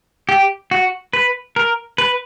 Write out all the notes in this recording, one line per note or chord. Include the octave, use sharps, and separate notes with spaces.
G4
F#4
B4
A#4
B4